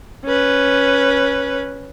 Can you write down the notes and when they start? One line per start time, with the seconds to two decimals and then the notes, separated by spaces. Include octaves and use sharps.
0.25 C#4 B4